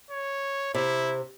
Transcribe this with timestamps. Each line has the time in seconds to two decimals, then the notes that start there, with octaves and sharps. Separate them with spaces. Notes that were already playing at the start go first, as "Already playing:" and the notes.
0.11 C#5
0.75 C3 E4